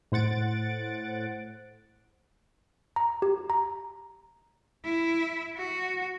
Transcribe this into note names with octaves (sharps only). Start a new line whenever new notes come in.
A2 C5 F#5 A6 D7
A#5
G4
A#5
E4
F#4